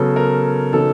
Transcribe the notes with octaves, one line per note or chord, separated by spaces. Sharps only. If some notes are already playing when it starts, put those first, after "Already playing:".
Already playing: C#3 F#3 B3 A4
A#4
C#3 F#3 B3 D#4 A4